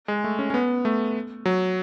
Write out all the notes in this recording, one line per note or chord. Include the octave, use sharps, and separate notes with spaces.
G#3
A3
C#4
C#4
B3
A3
F#3